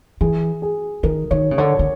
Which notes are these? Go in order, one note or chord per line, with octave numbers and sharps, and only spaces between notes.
E3 G#4
G#4
D#3 A#4
D#3 C#5
C#3
D3 C#5
D3